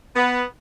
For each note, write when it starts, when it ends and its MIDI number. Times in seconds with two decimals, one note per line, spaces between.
0.15 0.43 59